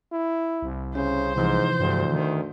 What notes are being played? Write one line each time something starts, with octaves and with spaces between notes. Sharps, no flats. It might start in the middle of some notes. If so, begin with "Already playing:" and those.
E4
C2
C#3 C#4 C5
G#2 C3 E3 F3
D2 G2
D#3